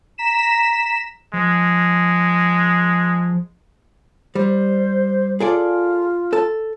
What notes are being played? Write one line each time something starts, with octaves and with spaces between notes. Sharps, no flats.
A#5 B6 E7
F3 G#3
G3 C5
F4 G#4 A4 D5
A4 A5